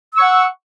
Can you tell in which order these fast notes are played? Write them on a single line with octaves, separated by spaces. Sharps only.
E6 C#6 F#5